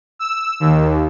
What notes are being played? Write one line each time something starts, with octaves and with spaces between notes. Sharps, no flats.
E6
D#2